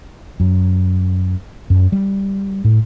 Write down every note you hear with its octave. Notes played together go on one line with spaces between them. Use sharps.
F#2
F#2
G3
A2